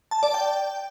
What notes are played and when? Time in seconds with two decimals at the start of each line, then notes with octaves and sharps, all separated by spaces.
0.11 A5
0.23 D5
0.34 G5